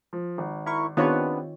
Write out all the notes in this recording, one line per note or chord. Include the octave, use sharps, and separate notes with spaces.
F3
G#1
E4 A#4 C#6
D#3 B3 C4 D4 F4 G4 B4 C#5